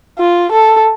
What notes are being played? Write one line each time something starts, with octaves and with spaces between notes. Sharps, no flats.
F4
A4